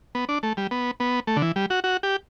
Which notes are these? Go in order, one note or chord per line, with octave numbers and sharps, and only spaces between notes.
B3
D4
A3
G3
B3
B3
A3
D3
E3
G3
F#4
F#4
G4